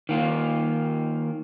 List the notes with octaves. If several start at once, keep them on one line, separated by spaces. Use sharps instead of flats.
D#3 A#3 F4